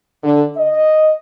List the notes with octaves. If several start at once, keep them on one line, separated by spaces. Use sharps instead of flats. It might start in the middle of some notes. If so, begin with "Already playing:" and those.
D3
D#5